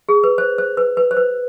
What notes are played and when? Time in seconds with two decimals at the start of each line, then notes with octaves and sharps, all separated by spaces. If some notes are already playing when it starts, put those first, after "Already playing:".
0.09 G#4
0.24 B4
0.38 C5
0.58 C5
0.77 B4
0.97 B4
1.11 C5
1.17 B4